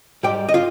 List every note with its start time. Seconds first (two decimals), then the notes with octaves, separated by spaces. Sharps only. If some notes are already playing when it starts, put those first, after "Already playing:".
0.23 G#2 G3 G4 G5
0.49 D#5
0.54 F4 F5